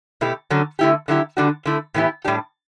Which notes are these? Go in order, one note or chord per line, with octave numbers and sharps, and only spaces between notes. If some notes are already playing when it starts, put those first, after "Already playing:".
B2 A3 E4 G4
D3 F#3 C#4
D3 A3 E4 G4
D3 F#3 A3 E4 G4
D3 G3 D4 F#4
D3 A3 E4
A2 E3 B3 E4 G4
A2 G3 D4 G4